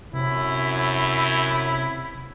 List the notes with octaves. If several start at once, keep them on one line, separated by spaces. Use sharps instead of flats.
F#2 C3 E4